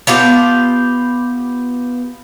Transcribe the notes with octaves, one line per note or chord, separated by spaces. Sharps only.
B3 F4 G4 A5